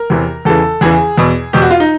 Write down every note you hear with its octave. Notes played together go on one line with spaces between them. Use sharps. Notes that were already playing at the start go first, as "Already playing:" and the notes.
Already playing: A#4
E2 C3 E3
E2 C#3 E3 A4
E2 C#3 E3 G#4
E2 B2
E2 B2 G4
F#4
F4
D#4